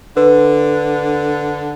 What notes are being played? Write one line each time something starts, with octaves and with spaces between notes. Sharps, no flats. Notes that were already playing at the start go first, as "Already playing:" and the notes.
D3 B4